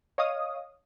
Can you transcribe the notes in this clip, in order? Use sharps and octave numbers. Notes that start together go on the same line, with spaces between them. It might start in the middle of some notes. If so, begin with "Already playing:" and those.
C#5 D#5 F5 D#6